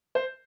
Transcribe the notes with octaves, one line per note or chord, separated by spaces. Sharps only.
C5